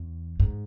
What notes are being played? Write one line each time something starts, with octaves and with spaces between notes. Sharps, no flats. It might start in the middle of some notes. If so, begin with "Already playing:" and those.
Already playing: E2
G#2